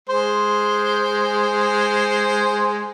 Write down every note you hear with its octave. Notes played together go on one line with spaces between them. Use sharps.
G#3 C5